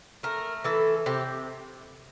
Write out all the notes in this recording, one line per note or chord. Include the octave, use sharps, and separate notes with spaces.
A3 A#4
E3 A4
C3 G4